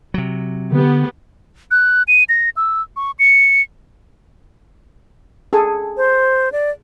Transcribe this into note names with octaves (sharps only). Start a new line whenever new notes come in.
C3 F#3
D3 B3 G4
F#6
D#7
A#6
E6
C#6
C#7
G#4 A4 G#5
C5
D5